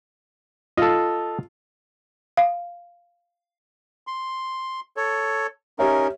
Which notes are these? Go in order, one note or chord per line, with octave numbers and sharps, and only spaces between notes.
F4 A4 D#5
F5
C6
A4 C#5
C#4 D#4 G4 A#4 C#5 E5